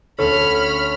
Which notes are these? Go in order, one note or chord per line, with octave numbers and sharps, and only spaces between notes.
D2 C#4 A4 B5 F6